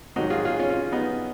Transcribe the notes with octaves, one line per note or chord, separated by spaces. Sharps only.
G#2 D#3 F#3 D#4 F#4
F4 G#4
F4 G#4
C#4 F4
C#4 F4
B3 D#4